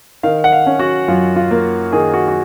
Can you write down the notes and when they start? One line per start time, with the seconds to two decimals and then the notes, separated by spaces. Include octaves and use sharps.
0.23 D#3 F5
0.44 F#5
0.52 F5
0.66 C#4
0.79 F#4
1.08 F#2 F4
1.36 F4
1.51 A#3
1.92 D#3 G#4
2.14 F#4
2.28 F#4